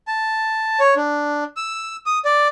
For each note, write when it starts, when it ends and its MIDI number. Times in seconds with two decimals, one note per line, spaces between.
0.07 0.80 81
0.80 0.94 73
0.96 1.44 62
1.57 1.96 88
2.06 2.19 87
2.25 2.48 74